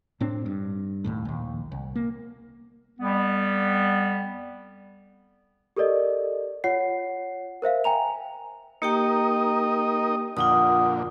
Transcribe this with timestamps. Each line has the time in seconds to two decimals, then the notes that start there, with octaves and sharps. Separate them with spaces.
0.21 A2 C4 D4
0.46 G2
1.04 E1 D#2 A2
1.25 A#1 D#2
1.72 C2
1.95 A#3
2.99 F2 G3 B3
5.76 G4 A4 A#4 D5 D#5
6.64 F4 C#5 F#5 C7
7.62 A#4 C5 E5 F5
7.84 G5 G#5 A#5 F7
8.82 A#3 D#4 G4 A#4 D#5 G5
10.37 F2 A#2 D3 F4 F#5 D#6